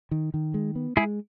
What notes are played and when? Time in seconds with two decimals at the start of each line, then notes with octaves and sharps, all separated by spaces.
0.11 D#3
0.34 D#3
0.54 G#3
0.75 B3
0.97 G#3 E4 G#4